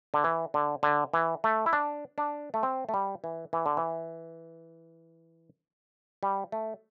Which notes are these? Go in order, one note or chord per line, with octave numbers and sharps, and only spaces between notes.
D3
E3
D3
D3
E3
A3
E4
D4
D4
A3
C4
A3
G3
E3
E3
D3
E3
G3
A3